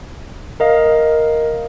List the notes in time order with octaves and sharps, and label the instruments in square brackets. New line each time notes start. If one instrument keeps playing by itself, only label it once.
[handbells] A#4 D#5 F5